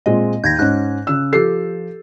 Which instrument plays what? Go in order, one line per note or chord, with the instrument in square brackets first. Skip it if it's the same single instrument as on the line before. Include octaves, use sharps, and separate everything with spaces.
[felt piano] A#2 G#3 C4 [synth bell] D#5
[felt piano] D#2 [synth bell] G6 G#6 A#6
[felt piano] G#2 C#4 [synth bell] F#6
[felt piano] C#3 E6
[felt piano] F3 C7 [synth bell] G4 A4